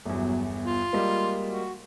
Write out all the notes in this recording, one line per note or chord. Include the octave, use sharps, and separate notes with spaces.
G1 E2 F#3
F4
G3 G#3 A#3
F#4